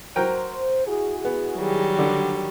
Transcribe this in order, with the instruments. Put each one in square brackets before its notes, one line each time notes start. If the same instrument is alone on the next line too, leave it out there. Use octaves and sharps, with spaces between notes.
[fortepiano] F#3 A#4 G5 [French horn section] C5
[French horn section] E4 F#4 G#4
[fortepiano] B3
[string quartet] D#3 F#3 G3
[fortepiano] D3